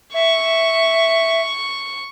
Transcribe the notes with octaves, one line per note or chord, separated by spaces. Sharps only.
E5 C#6